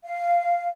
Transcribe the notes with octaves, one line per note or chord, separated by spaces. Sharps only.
F5